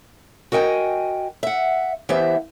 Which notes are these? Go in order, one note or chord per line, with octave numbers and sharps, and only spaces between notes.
F#4 A#4 D#5 G5 G#5
E5 F#5
E3 B3 G4 C5 E5